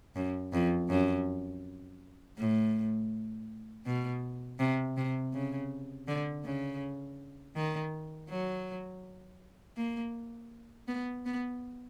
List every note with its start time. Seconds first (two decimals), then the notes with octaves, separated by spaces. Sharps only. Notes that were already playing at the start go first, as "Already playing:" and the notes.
0.15 F#2
0.53 F2
0.90 F#2
2.38 A2
3.86 B2
4.59 C3
4.97 C3
5.33 C#3
6.08 D3
6.45 C#3
7.56 D#3
8.30 F#3
9.77 A#3
10.88 B3
11.26 B3